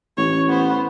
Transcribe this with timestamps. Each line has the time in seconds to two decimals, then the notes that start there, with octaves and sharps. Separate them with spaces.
0.17 A1 C#5
0.49 B3 C5